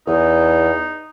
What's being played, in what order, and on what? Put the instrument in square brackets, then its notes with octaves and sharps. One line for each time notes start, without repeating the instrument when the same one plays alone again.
[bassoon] E2 [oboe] D#4